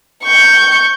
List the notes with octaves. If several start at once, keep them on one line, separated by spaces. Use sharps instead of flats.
C#6 G6